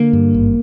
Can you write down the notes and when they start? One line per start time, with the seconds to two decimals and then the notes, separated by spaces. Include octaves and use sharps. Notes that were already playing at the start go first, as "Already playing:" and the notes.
Already playing: D3 A#3
0.13 G2
0.34 G#1